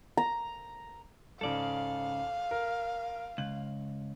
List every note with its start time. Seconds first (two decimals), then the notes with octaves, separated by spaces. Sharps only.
0.17 A#5
1.41 G#2 C#3 A4 D5 F5
2.51 A#4
3.38 C#2 F#7